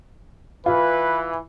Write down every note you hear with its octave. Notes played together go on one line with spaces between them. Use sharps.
E3 F4 B4